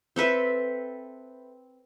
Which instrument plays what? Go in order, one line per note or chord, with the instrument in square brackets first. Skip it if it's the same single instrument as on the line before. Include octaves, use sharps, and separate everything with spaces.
[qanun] C4 A4 B4 E5